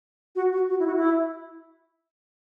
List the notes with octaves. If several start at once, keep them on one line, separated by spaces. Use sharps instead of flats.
F#4
F#4
F#4
E4
F#4
E4